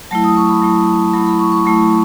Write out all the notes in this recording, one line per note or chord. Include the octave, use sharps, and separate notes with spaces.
F#3 A3 E4 A5
D#6
C#6
B5
F#3 A3 E4
F#3 A3 E4 B5
B5
C#6
C#6
F#3 A3 E4